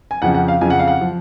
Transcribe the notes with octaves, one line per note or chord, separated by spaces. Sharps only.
G#5
F2 C#3 F3 F#5
F#5
F5
F2 C#3 F3 G#5
F#5
F5
F#5
F3